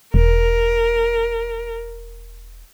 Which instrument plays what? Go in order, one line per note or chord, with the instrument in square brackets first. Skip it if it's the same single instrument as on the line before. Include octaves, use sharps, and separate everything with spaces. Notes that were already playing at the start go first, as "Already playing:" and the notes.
[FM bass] E1 [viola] A#4